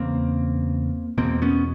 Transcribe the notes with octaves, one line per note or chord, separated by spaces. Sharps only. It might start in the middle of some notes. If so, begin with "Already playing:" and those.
Already playing: E2 C#3 A#3 C4
E2 B2 A#3 C4
B3 C#4